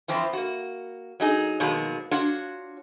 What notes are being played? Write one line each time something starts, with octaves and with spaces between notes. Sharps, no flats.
E3 F3 C4 E4
A#3 F#4
F#3 D#4 G#4
B2 D#3 F3 F#3 G#3 A#3
D4 F4 F#4 C#5 F#5